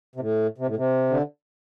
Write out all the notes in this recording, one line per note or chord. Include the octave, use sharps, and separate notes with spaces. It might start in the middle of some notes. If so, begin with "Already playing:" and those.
C3
A2
C3
A2
C3
D3